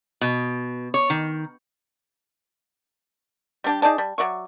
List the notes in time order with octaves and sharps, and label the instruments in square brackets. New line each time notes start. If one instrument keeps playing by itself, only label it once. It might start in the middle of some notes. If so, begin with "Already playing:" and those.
[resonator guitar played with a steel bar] B2
C#5
D#3
[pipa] G3 D4 G4
D#4 G#4 D5 A5
G3
F#3 D5 E5 C#6